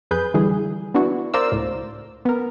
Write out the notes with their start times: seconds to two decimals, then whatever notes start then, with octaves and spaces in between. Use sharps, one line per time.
0.11 F2 G#4 B4 G6
0.34 D3 E3 G3 G#4
0.94 B3 D4 E4 F#4
1.34 A#4 C5 D5 F5 E6
1.52 C#2 A2
2.25 B3 A#4